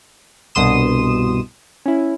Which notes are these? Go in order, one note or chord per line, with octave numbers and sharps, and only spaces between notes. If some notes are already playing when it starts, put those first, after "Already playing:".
C2 G2 B2 C6 D#6 E7
C#4 E4